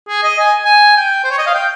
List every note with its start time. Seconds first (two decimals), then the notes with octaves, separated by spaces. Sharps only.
0.09 G#4
0.24 D#5
0.39 G#5
0.65 G#5
0.97 G5
1.24 C5
1.31 C#5
1.38 D#5
1.47 F5
1.54 G5